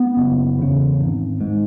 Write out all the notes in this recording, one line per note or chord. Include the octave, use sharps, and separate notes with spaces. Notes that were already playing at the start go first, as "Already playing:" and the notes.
Already playing: B3
F#1
E2 C#3
G#1
G#2